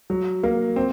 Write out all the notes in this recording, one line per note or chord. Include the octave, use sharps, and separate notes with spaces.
F#3
A#3
C4